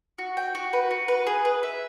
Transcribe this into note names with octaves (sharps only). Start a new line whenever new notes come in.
F#4
G5
F#4
B4
F#4
B4
G#4
B4
E5